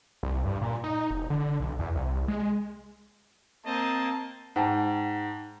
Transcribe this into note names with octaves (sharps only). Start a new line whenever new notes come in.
C2
G2
A#2
D#4
E1
D3
B1
E2
C2
G#3
A#3 C4 C5 D#5 A5
G#2 F#5 G5 A5